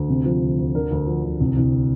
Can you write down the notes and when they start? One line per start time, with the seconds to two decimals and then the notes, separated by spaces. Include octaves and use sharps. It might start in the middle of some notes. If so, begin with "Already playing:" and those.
Already playing: D2
0.09 C3
0.25 F3
0.42 D2
0.58 D2
0.75 D3 A#4
0.91 D2
1.07 F3
1.24 D2
1.40 C2
1.57 C2